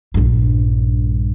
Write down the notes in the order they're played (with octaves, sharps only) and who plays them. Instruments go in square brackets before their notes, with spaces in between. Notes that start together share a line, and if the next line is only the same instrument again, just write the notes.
[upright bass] A#1 G2